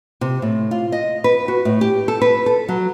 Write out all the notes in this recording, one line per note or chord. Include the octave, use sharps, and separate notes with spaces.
C3
A2
F4
D#5
B4
F#4
A2
G4
A4
B4
A4
F#3